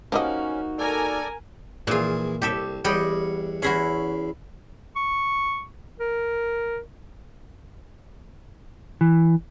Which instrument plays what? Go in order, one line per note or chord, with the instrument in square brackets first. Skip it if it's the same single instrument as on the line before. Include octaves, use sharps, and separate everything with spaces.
[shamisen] F3 G3 D#5 [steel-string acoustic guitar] A#3 D#4 F#4 [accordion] C#4
[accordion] A4 D5 [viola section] A#4 G#5
[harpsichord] A#1 E3 G#4 [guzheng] A#2 F4
[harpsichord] C2 [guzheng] G4 A4 E5
[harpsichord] E2 C#5 F#5 [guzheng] G3 D#5 G5
[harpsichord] E2 B5 C6 [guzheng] C#4 E4 F#4
[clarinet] C#6
A#4
[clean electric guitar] E3